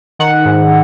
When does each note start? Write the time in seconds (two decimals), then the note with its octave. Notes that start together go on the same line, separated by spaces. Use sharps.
0.19 D#3 F#5
0.45 G#2